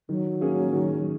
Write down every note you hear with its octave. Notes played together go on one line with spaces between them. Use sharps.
D#3 F#3
A#3 C#4 G#4
D#3